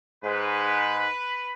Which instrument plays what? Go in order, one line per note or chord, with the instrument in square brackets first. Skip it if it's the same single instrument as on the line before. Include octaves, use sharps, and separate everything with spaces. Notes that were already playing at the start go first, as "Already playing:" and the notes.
[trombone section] G#2 [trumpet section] B4